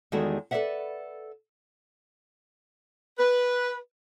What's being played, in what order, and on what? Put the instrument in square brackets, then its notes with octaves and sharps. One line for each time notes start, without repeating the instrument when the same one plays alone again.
[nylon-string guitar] E2 D#3 G3 G#3 F#4 A4
A4 B4 C#5 D5 E5 F#5
[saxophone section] B4